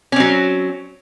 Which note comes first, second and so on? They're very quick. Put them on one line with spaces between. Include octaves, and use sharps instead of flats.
C#4 C4 F#3